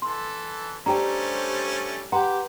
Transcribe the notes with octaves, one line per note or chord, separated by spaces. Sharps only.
E3 A4 C6
G3 A3 C#4 D4 G4 C5 A#5
G4 B4 F#5 A#5 C6